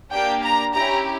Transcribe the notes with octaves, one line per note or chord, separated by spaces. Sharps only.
A#3 D4 G4 G5
A#5
C#4 E4 G4 A#5